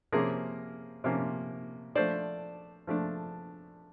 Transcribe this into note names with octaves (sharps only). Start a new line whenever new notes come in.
C3 F3 A#3 C#4 G#4 A#4
C3 F3 A#3 C#4
F3 A3 D4 C5 D5
F3 A3 D4